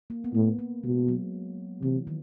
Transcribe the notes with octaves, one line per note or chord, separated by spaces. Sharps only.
A#3
B3
A2 A#3
A#3
B2 G#3
F#3
C3 E3
D#3